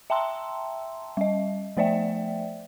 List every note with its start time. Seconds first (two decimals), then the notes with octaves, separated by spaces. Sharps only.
0.10 E5 G5 A5 A#5 C6 E6
1.17 G3 D#5
1.77 F3 A3 C5 D5 E5 G5